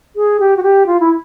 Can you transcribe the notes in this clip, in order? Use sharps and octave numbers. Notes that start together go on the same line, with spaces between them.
G#4
G4
F#4
G4
F4
E4